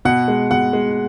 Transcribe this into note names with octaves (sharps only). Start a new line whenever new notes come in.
B2 F#5
G#3
B2 F#5
G#3